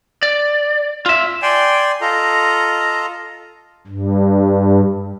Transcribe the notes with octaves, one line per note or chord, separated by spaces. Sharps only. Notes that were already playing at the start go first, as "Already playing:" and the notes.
D5
F4 E5
D5 G5 G#5 C6
F4 A4 D#5 A#5
G2